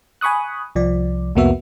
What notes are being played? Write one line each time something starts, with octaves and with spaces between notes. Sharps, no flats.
G#5 B5 C#6 D#6 F#6
C2 F3 D5
C2 F2 A#3 B3 F#4 E5